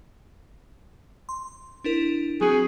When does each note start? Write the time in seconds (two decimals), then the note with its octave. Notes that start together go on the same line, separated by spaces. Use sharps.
1.29 C6
1.84 D4 E4 A#4
2.41 F#3 C4 F#4 G#4